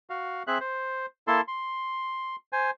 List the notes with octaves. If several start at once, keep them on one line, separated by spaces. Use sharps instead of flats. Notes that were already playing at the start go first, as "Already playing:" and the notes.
F#4 F5
C4 G#4 E5 F#6
C5
A#3 E4 A4 A5 C6
C6
C5 G#5